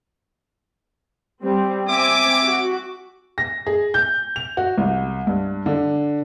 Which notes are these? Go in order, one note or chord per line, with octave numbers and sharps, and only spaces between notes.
G3 C4
C4 E5 G#5 D6
F#4
A#6
G#4
G6
F7
F#4
C2
G2
D3